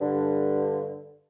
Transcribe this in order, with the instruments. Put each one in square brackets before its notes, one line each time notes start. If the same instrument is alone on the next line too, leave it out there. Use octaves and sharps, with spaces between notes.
[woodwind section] G2 D3